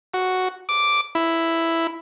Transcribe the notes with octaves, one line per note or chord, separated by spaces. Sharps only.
F#4
D6
E4